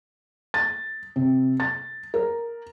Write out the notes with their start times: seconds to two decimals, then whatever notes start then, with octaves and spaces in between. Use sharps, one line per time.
0.54 A6
1.16 C3
1.60 A6
2.14 A#4